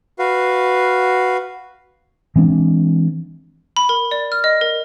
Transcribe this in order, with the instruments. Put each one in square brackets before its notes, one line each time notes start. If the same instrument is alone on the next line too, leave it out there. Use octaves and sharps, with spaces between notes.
[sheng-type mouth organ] F#4 B4 F5
[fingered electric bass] E3 G#3 C4 D4
[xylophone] B5
A#4
D5
F6
D#5
A#4